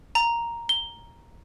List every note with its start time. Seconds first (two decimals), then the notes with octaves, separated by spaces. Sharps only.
0.15 A#5
0.69 G7